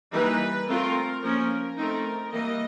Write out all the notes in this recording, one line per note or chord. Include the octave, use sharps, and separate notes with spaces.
E3 G3 A#3 D#4 B4
A3 C4 F4 A#4
F3 A#3 C#4 A#4
A3 C4 D#4 A#4
E3 G3 A#3 D#5